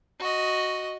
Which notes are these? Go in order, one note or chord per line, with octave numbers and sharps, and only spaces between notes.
F#4 D#5